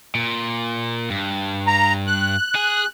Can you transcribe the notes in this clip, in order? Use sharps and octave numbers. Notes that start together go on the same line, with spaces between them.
A#2
G2
A#5
F#6
G#4